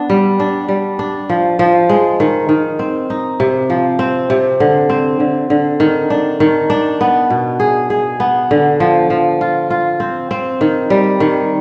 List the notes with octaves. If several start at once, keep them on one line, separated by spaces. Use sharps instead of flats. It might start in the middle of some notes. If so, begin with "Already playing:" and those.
Already playing: B3 D4
G3
D4
G3
D4
F3
F3
G#3
D#3
D#3
C4
D#4
C3
F3
C4
C3
D3
C4
D3
D3
D#3
D4
D#3
D4
B3
B2
G#4
G#4
B3
D3
F3
F3
F4
F4
C4
C4
D#3
G3
D#3